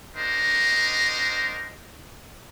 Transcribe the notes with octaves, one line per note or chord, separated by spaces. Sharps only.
D4 F#4 A#4 C5 D#5